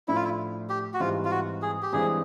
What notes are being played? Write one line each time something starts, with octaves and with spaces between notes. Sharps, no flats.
A2 F3 A3 D4 E4
F4
E4
G4
F#4
G#2 E3 G3 C4 F4
F4
F#4
G#4
G4
G2 E3 G#3 C4 G#4